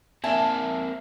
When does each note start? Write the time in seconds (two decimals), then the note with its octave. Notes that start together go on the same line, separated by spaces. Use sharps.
0.24 A#3 C4 E5 G#5 A5